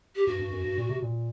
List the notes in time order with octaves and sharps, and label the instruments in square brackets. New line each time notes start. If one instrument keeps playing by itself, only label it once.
[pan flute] G4
[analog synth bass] G2 [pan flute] F#4
[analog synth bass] G2
F#2
G2
A#2
C3
A#2